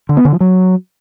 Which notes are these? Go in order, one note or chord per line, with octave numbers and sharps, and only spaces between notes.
D3
B3
D3
F3
F#3